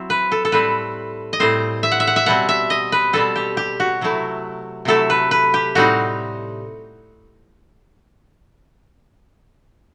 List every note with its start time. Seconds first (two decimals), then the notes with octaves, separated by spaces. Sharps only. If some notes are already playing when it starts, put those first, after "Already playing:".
Already playing: F#3 C4 E4
0.10 B4
0.32 A4
0.45 A4
0.52 A2 G3 C4 B4
1.33 D#5
1.40 A2 G3 C4 C5
1.83 E5
1.92 F#5
2.00 E5
2.07 F#5
2.16 E5
2.26 B2 G3 C4 F#5
2.49 E5
2.70 D#5
2.92 B4
3.13 B2 G3 C4 A4
3.36 G4
3.57 G4
3.80 F#4
4.01 C3 F#3 A3 E4
4.85 C3 F#3 A3 E4 A4
5.10 B4
5.31 B4
5.54 G4
5.75 A2 G3 C4 D#4 F#4